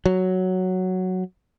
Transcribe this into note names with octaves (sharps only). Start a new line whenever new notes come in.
F#3